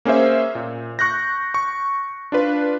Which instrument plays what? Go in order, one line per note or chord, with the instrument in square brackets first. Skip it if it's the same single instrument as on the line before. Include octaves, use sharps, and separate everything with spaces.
[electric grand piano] A#3 C#4 G#4 C5 E5
A#2
C#6 F#6 G6 A#6
C#6
D4 F4 B4